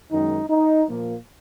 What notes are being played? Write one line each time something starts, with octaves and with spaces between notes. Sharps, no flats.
F#2 D#3 G#3 D#4
D#4
A#2 F3 A#3